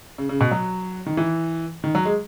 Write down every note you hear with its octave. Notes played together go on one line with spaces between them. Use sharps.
C#3
C#3
B2
F#3
D#3
E3
D#3
F#3
G#3